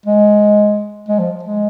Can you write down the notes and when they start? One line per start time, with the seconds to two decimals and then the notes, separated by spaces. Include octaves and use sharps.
0.06 G#3
1.08 G#3
1.19 F3
1.43 G#3